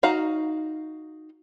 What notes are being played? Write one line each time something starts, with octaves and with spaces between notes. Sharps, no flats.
D#4 F#4 F5 A#5